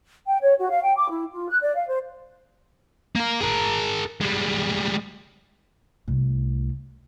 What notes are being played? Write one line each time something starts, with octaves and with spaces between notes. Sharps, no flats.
G5
C#5
F#4
F5
G5
D6
E4
F4
F#6
D5
F5
C5
A#3 A#4
G#4 A#4
G3 G#3
C2 A3